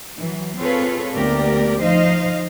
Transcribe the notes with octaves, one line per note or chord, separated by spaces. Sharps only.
E3 F#3
C4 F4 G#4 A4 B4 C#5
D2 A#3 B3 G4 A#4 D5
F3 D#4 C5 D#5 F5